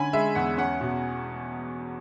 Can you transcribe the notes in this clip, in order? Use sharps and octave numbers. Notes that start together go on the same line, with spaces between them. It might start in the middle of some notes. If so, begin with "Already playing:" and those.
Already playing: D3 C#4 G#5 B5
G#3 E5
E2 F#5
C#4 F#5
B2